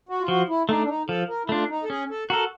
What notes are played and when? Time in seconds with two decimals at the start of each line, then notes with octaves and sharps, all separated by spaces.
0.09 F#4
0.21 F4
0.28 F3 F#4
0.49 E4
0.68 A3 D4 D#4
0.83 D4
0.88 D#4
1.08 F3 A4
1.28 A#4
1.45 E4
1.49 A3 D4 F4
1.70 D#4
1.83 A4
1.89 C#4 G#4
2.10 A4
2.30 F#4 A4 A#4